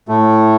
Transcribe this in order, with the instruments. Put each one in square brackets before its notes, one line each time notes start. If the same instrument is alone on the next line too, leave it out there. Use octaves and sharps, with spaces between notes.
[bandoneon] A2 A3